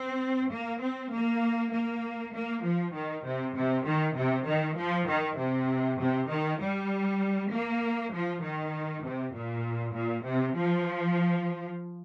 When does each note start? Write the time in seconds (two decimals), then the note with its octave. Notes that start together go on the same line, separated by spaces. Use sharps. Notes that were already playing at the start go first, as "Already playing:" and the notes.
Already playing: C4
0.52 A#3
0.82 C4
1.13 A#3
1.73 A#3
2.35 A#3
2.64 F3
2.94 D#3
3.25 C3
3.57 C3
3.86 D#3
4.17 C3
4.47 D#3
4.78 F3
5.08 D#3
5.38 C3
6.00 C3
6.30 D#3
6.60 G3
7.52 A#3
8.13 F3
8.43 D#3
9.04 C3
9.35 A#2
9.95 A#2
10.26 C3
10.57 F3